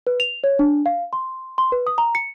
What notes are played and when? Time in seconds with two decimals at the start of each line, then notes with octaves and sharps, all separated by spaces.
0.07 B4
0.20 F7
0.44 C#5
0.59 D4
0.86 F5
1.13 C6
1.58 C6
1.72 B4
1.87 D#6
1.98 A#5
2.15 C#7